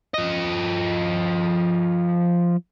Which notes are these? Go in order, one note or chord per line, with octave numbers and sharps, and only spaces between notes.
F3 D#5